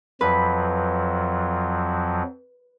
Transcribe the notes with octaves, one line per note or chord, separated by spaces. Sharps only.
F2 F3 F#3 B4